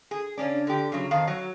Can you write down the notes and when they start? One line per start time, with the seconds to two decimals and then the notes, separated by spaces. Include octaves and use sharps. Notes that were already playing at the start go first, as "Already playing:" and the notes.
0.11 G#4
0.38 C#3 C#4 D4
0.67 D3 G4
0.92 C#3 F#3
1.11 F2 D#3 F5
1.27 F#3